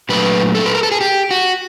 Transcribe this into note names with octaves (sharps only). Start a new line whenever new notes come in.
A#2 F#3 A3 D4 B4
A4
B4
A#4
A4
G#4
G4
F#4